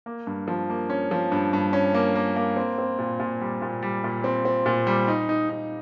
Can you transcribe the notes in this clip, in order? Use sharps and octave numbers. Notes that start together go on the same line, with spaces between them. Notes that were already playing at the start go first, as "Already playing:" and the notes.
A#3
G2
F3
A#3
C#4
F3
G2
G2
C#4
A#3
A#3
A#3
C4
C4
A#2
A#2
G3
A#2
G3
A#2
C4
C4
A#2
G3
D#4
D#4
D#4